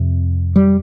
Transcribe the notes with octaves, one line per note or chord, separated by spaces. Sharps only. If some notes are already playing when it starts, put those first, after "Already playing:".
Already playing: F2 C3
G3